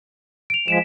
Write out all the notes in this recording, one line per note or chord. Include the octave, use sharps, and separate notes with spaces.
D7 F7
F3 G#3 B6 D7 E7